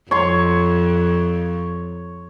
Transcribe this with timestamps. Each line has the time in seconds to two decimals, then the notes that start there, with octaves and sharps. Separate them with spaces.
0.11 F2 C#5 C6